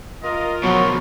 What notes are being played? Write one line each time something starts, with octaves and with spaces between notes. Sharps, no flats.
F4 A#4 D#5
B2 F3 F#3 C#6